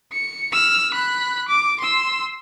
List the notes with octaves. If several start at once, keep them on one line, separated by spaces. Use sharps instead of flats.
C#7
E6 F6
B5 F#6
D6
C6 E6